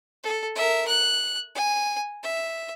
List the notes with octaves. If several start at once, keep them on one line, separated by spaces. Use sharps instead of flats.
A4
A#4 E5
F#6
G#5
E5